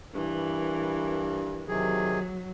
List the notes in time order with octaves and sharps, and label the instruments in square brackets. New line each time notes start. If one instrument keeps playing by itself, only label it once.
[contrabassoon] G2 [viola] E3 A#4
[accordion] C3 D#3 G#4 [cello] F#3